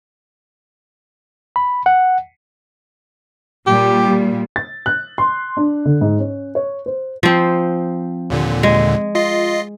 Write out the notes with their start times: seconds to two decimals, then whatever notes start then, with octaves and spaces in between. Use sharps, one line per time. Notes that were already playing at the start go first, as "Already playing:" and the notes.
1.56 B5
1.86 F#5
3.67 A#2 G3 G4
4.56 A6
4.86 F#6
5.18 C6
5.57 D4
5.85 D3
6.01 G#2
6.19 C#4
6.55 C#5
6.86 C5
7.23 F3 C4
8.30 D#2 A#2 D3
8.63 G#3
9.15 F4 D#5 C7